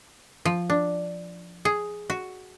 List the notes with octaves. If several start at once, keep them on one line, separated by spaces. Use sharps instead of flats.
F3
D4
G#4
F#4